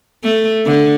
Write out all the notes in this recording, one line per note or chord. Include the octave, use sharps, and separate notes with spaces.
A3
D3